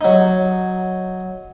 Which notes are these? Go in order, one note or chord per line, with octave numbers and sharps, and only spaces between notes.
F#3 D#4